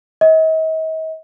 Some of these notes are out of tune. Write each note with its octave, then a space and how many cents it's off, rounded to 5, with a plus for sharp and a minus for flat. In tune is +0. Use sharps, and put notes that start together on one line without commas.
D#5 +45